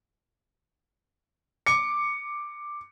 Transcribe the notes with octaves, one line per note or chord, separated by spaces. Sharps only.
D6 C#7